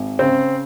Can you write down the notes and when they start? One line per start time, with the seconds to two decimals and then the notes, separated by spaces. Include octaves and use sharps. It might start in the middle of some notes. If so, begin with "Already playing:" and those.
Already playing: G#1
0.19 C#3 C4